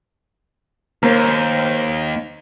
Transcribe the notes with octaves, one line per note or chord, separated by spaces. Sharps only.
D#2 A#3 C5